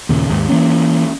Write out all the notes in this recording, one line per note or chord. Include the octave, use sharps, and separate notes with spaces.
D#2 A#2 C#3
D#2 G#2
E3 A#3 C#4